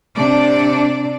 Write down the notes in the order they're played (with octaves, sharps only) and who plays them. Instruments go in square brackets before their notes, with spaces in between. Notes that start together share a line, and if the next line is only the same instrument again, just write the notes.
[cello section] C3 D4 D5